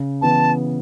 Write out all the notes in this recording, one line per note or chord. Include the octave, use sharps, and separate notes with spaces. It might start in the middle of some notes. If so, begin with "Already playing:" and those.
Already playing: C#3
E3 B3 A5